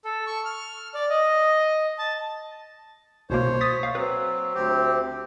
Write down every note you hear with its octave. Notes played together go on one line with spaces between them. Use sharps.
A4
C#6
F6
D5
D#5
A5
C2 B2 A#3 C5 C#5
D#6 A6 B6
F5
F#3 C4 B4
D2 C4 G4